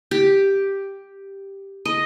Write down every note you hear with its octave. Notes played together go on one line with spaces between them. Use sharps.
G4
D#5